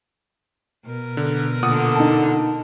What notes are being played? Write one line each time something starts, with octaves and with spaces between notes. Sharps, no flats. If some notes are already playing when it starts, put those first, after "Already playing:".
B2 A#4
D3
A#2 D3 F#5 D#6
D#4 A5